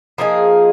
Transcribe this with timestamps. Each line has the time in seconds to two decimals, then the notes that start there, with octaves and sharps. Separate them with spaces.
0.18 F3 A#3 D#4 G#4